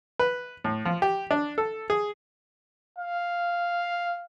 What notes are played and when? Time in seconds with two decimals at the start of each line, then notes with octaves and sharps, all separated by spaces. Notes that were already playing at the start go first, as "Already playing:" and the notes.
0.19 B4
0.64 A2
0.85 F3
1.02 G4
1.31 D4
1.58 A4
1.90 G#4
2.99 F5